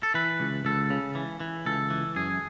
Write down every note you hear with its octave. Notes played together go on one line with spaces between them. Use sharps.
A4
E3 B4
C#2
C#2 A4
C#3
E3
E3
C#2 A4
E3
F#2 G#4